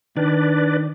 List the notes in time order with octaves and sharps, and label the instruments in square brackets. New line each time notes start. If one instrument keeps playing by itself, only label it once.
[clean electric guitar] D#3 [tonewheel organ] D4 B4 D5